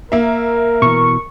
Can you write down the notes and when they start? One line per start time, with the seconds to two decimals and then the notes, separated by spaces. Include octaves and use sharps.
0.12 A#3 A#4 E5
0.82 B2 E3 C#6